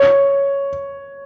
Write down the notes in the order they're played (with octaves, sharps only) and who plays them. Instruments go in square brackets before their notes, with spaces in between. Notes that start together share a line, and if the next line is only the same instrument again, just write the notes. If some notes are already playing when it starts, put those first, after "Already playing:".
Already playing: [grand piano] C#5